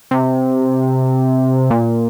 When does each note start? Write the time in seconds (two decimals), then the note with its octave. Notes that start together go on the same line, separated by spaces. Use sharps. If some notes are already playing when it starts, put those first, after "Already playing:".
0.11 C3
1.71 A#2